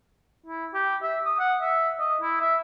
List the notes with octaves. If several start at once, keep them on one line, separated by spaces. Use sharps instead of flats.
E4
G4
E5
D#6
F#5
E5
D#5
E4
E5